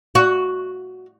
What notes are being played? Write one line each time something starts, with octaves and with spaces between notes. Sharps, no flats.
F#4